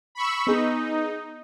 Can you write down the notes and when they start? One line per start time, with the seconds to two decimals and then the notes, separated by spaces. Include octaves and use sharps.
0.15 B5 C#6 E6
0.47 B3 D#4 G#4